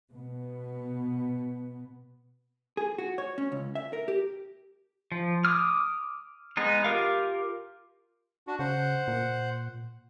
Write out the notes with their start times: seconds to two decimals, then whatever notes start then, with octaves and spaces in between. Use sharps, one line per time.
0.12 B2 B3
2.77 G#4
2.98 F#4
3.18 C#5
3.38 C#4
3.52 C#2
3.75 E5
3.93 A#4
4.08 G4
5.12 F3
5.45 D6 D#6 F6
6.57 G#3 B3 D#4
6.84 F4 G4 A#4 F5
8.47 D4 F#4
8.59 C#3 C5 F#5
9.08 A#2